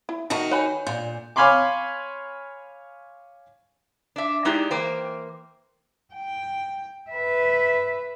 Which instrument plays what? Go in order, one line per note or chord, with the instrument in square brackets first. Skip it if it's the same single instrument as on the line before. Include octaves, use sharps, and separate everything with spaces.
[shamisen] E4
[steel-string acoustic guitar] D#3 D#4 F#4 [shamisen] A#4 E5 A5
[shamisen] B4 G5 B5 [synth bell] C#5 G#5 G6
[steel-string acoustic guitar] A#2 [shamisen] D3 F4 [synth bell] G6
[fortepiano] C#5 F5 G#5 B5 C6 D6
[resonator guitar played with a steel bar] D4 E5
G#3 D#4 E4 G4 G#4 D5
E3 A#3 C5 G5
[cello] G5
B4 E5